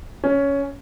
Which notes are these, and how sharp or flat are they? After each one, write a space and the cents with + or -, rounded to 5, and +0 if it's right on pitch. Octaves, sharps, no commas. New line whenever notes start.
C#4 +10